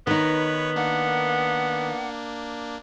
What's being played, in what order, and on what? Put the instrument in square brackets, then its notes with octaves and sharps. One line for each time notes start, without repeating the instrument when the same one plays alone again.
[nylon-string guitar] D#3 D#4 [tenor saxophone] B3 [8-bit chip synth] B4 C#5
[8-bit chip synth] A#3 D4 [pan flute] F#5